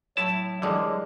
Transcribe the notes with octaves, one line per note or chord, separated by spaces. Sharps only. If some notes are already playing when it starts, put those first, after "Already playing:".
A2 F#3 E4 A5
D3 E3 G3 G#3 A#3